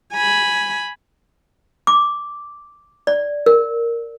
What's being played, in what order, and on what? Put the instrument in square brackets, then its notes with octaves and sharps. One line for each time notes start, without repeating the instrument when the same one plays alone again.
[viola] G#5 B5
[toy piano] D6
D5
A#4